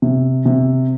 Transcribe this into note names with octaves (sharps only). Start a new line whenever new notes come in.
C3
C3